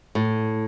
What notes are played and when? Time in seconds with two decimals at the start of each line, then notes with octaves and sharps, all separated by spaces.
0.15 A2